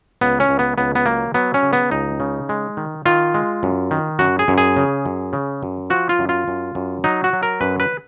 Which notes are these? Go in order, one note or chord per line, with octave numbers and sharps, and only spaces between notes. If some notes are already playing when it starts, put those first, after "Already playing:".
C#2 B3
C#4
C#2
B3
C#2 B3
B3
F#3 A#3
F#3 B3
C#4
C#3
B3
C#2 D#4
C#3
G#3
D#3
D#3 F4
G#3
F#2
D#3
F#2 F#4
G#4
F#2
G#4
C#3
F#2
C#3
F#2
F3 F#4
F4
F#2
F4
F#2
F#2
F#3 D#4
F#4
F#3
A#4
F#2 B4
B4